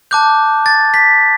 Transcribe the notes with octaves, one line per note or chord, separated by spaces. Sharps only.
A5 D6 F#6 G6
A6
B6